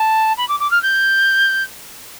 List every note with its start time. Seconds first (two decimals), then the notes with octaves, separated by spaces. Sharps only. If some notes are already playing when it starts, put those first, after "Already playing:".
Already playing: A5
0.37 B5
0.48 D6
0.60 D6
0.71 F6
0.82 G6